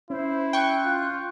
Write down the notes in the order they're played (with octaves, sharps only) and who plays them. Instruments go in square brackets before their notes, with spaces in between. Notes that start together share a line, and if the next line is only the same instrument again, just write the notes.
[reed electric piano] C#4 [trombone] E4 [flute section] C5
[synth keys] G5 C#6 [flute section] C6 F#6
[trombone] F4